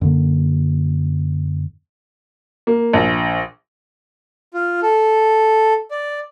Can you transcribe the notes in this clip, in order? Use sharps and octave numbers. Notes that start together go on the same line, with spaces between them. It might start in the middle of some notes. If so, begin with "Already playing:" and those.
F#2 D3 A#3
A#3
A#1
F4
A4
D5